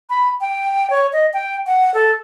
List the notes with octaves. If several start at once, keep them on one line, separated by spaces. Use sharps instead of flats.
B5
G5
C#5
D#5
G5
F#5
A4